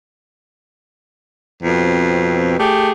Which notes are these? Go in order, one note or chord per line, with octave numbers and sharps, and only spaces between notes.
F2 B2 C4
A3 G4 G#4